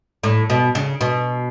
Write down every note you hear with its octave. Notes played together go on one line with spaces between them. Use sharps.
A2
B2
C#3
B2